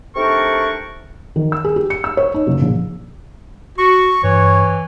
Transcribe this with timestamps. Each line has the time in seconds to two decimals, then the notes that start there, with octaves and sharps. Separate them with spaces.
0.16 C3 A3 D4 D#4 A#4 C#6
1.36 D#3
1.52 E6
1.64 G#4
1.76 G4
1.90 C#7
2.04 E6
2.17 C#5
2.34 D#4
2.47 F#1
2.62 A#1
3.78 F#4 C#6
4.23 G2 E3 C#5